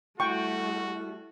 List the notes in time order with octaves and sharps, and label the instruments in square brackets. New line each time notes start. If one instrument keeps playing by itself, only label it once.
[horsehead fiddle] G3 A3 [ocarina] E4 [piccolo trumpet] F#4 [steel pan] G5 C#6